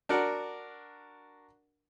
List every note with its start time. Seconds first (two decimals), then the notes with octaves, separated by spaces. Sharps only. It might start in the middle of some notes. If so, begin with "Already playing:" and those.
0.09 D4 F#4 A#4 F#5